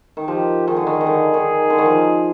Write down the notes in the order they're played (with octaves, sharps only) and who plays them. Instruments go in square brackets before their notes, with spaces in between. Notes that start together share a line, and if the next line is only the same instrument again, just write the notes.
[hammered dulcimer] D#3
[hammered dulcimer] F3 [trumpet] G4
[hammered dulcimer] D#3 [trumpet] G#4
[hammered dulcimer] D3
D#3
D#3
D3
D#3
D3
D#3
F3